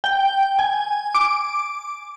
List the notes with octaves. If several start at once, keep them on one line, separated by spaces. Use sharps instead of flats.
G5
G#5
D6